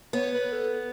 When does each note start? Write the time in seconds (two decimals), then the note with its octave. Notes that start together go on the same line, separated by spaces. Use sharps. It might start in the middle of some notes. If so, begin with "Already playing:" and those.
0.13 B3 C#5
0.33 B4
0.52 A4